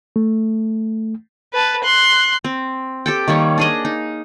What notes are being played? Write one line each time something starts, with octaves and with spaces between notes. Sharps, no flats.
A3
B4 A5
C6 F#6
C4
G4 A4 G5
D#3 G3 A#3 C#5
D4 G#4 D#5
D#4